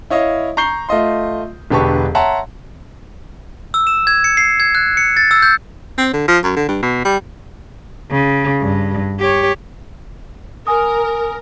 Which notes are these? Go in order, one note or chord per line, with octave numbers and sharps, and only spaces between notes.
E4 C#5 D#5 F5
A#5 C#6 G6 C7 G7
A3 F4 D#5 C6
E1 D3 G4 B4 A5 C#6
C#5 E5 F#5 A5 A#5 C6
E6
E7
G#6
C#7
C7
G#6
F#6
C#7
A6
E6
G6
C4
D3
F3
F#2
D3
G2
B2
G3
C#3
G2
G4 C#5
A#4 G#5 D#6